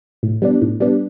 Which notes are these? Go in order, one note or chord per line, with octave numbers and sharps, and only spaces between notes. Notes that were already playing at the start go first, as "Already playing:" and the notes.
A2
G3 B3 D4
A2
G3 B3 D4